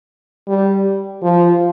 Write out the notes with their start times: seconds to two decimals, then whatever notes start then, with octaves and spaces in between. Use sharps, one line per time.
0.47 G3
1.23 F3